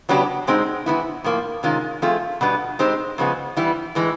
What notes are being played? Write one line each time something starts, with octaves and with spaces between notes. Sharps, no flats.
C#3 F#3 B3 D4 G4
B2 G#3 C4 D#4
E3 G3 B3 E4
A2 F3 A#3
C3 D#3 G#3 C#4 F4
F3 A3 C4 F4 G#4
B2 G3 B3 D4
G#3 C4 D#4 G4 C5
C#3 F3 G#3 B3
E3 G3 B3 E4
A2 E3 G#3